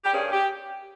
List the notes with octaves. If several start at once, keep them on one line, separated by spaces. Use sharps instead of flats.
G4
G2 G3 A#3 C#4 G#4
G4